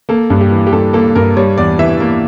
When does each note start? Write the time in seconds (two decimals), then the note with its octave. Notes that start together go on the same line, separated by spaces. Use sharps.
0.09 A#3 A4
0.30 G2
0.41 G4
0.51 E3
0.67 G4
0.72 G2 A4
0.93 A#3 A4
1.15 G2 A#4
1.37 G3 C#5
1.58 E2 D5
1.79 E3 E5
2.00 A#3